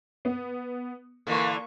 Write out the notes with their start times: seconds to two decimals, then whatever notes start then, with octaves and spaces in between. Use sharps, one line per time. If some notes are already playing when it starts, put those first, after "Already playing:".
0.25 B3
1.27 A#2 D3 E3 A#3 C#6